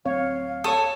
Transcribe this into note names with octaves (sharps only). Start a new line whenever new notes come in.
D1 C4 C#5 F5
A4 C#5 C#6 D#6